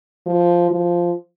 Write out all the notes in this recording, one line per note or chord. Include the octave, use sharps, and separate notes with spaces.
F3
F3